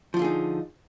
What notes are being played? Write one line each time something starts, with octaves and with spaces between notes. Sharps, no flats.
D3 F3 D#4 F4 G#4